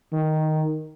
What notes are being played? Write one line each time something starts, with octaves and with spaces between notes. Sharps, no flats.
D#3